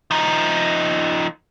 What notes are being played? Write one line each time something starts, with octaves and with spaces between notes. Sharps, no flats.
F3 D#4